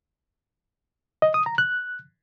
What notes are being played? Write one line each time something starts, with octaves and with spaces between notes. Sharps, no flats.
D#5
D#6
A#5
F#6